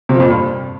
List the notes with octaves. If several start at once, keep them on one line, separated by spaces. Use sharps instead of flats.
C3
F3
F2
A#2
G2